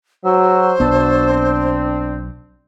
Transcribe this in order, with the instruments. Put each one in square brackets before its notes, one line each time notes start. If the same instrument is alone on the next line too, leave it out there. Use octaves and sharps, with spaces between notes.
[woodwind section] G#2 F#4 E6 [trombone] F#3 [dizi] C5
[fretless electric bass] B1 B3 [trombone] D4 [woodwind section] F#4 A5 E6
[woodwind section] C4